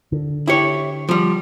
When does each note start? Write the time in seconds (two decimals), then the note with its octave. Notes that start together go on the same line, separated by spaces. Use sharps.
0.12 D3
0.47 E4 G4 C#5
1.09 F3 G3